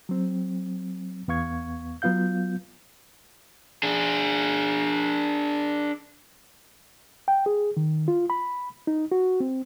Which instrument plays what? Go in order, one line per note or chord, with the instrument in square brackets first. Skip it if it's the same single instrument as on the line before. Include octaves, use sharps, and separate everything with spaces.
[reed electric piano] F#3 C4
E2 B3 F5 C#6 G#6
F#3 B3 F4 F5 G6
[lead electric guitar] D4 G#4
[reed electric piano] G5
G#4
D#3
F4
B5
D#4
F#4
C4